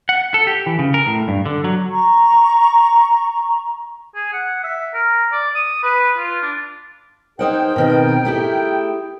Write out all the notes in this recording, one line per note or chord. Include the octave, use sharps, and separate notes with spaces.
F#5
A4
G4
E3
C#3
A#4
A2
G2
D3
F#3
A#5 C#6
G#4
F#5
E5
A#4
D5
D#6
B4
F4
D4
D#4 G#4 A#4 C5 F#5 G5
B2 D#3 C4
A3 E4 G4